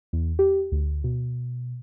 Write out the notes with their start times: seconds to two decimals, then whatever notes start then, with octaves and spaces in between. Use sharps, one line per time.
0.13 E2
0.39 G4
0.72 D2
1.04 B2